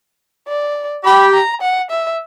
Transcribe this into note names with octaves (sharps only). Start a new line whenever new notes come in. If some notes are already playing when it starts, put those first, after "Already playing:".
D5
G4 B5
A#5
F#5
E5